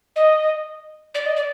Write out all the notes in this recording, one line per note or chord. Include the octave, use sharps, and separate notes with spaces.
D#5
D5
D#5
D5